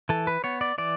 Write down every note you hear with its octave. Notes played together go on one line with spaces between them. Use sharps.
E3 A4
B4
B3 C#5
D5
E3 D5